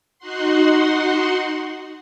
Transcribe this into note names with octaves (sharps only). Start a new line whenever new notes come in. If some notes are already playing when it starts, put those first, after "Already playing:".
D#4 F#4 F#5 C6